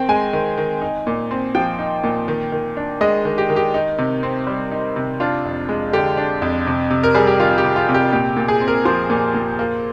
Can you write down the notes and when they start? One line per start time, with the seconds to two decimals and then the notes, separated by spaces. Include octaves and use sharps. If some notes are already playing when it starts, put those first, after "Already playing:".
Already playing: D#3 C4 G5
0.09 G#3 G#5
0.33 D#3
0.57 D#3
0.82 D#4
1.07 A#2
1.31 C4
1.55 F3 G5
1.79 D#4
2.04 A#2
2.28 D#3
2.52 D#3
2.77 D4
3.01 G#3 D#5
3.25 D#3
3.38 G4
3.50 D#3
3.56 G4
3.74 D#4
3.98 C3
4.23 C4
4.47 G3
4.71 D#4
4.96 C3
5.20 D4 F4
5.45 F2
5.69 G#3
5.93 D3 G4
6.17 D4
6.42 F2
6.67 C3
6.90 C3
7.03 A#4
7.15 G3 G#4
7.27 G4
7.40 D#3 F4
7.58 G4
7.63 C3
7.76 F4
7.89 C3
7.94 G4
8.12 A#2 G4
8.36 A#2
8.48 G#4
8.61 C4
8.68 A#4
8.85 F3 C5
9.10 A#2
9.34 A#2
9.59 A#3